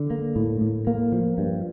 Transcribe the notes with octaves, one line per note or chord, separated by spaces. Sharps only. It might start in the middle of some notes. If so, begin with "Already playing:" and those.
Already playing: D3
A#3
A2
A2
A#3
F3
G2